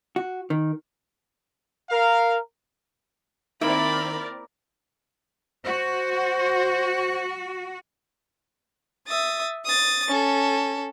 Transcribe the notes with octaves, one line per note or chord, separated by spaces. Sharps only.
F#4
D#3
A#4 F5
D#3 A#3 C4 E4 A#4 D5 E5 B5
F#4 C5
E5 D#6 A6
D#6 A6
C#4 A4